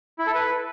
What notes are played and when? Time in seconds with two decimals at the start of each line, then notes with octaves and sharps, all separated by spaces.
0.19 E4
0.27 A4
0.35 B4